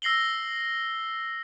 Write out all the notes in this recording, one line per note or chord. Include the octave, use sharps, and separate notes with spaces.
E6 A#6 C7 F#7 G7